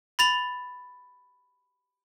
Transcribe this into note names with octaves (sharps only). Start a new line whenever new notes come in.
B5 A6 F7